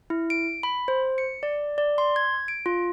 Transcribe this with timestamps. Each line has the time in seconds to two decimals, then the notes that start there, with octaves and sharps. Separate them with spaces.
0.10 E4
0.30 D7
0.63 B5
0.88 C5
1.18 C#7
1.43 D5
1.78 D5
1.98 C6
2.16 G#6
2.48 D7
2.66 F4